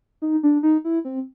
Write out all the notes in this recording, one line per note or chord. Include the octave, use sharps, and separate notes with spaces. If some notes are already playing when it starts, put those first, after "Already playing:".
D#4
D4
D#4
E4
C4